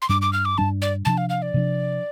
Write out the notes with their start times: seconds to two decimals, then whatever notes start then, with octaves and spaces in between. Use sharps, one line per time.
0.02 C6
0.09 G2 G3 D4 D6
0.22 D6
0.33 F6
0.45 D6
0.58 G2 G3 D4 A5
0.82 D5
1.05 C3 F3 D4 A5
1.18 F5
1.29 F5
1.42 D5
1.54 C3 F3 D4